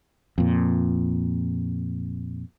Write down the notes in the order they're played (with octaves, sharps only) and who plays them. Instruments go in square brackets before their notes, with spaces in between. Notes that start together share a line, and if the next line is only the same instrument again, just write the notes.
[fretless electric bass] F2 A#2